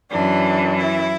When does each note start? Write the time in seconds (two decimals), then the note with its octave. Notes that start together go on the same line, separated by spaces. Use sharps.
0.11 F#2 E3 D4
0.76 E4